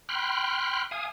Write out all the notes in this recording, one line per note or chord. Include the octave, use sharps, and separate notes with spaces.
G5 B5 C6 F6 F#6
F5 G#5 D#6